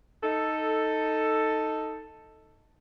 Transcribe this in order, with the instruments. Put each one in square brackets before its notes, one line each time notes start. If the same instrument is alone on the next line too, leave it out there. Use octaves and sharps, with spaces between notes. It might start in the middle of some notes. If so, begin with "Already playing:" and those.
[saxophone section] D#4 A4